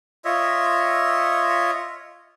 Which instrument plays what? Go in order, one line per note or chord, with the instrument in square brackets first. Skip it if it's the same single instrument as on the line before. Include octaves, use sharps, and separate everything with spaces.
[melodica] F4 C#5 D#5 E5